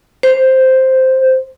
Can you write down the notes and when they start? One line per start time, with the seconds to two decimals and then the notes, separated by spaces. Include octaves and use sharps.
0.23 C5